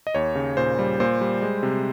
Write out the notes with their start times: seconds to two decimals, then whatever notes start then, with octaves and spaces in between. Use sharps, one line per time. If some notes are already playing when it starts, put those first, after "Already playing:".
0.07 D#5
0.15 D#2 C#5
0.35 C#3
0.57 A#2 C5
0.79 G3
1.00 A#2 C5
1.21 G3
1.42 G#3
1.63 C3